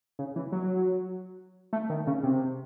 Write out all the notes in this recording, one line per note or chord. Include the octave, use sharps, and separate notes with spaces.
C#3
E3
F#3
A3
D#3
C#3
C3